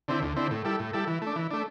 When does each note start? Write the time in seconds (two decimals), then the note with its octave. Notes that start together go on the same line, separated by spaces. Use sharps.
0.08 D3 C4 E4
0.22 D2
0.36 D3 C4 E4
0.51 A2
0.65 G3 E4 A4
0.80 A2
0.93 G3 E4 A4
1.07 E3
1.22 A3
1.27 D4
1.36 E3
1.51 A3 D4